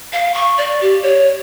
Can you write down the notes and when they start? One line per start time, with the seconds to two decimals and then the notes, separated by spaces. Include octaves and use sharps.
0.13 F5
0.34 C#6
0.58 D5
0.81 G4
1.03 C#5